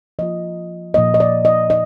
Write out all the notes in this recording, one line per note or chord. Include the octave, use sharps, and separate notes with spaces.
F3 A#3 F4 D#5
A#2 F3 A#3 D#4 D#5
D#5
D5
D#5
D#5